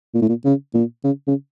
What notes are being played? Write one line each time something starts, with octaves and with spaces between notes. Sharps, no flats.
A#2
A2
A#2
C#3
A#2
C#3
C#3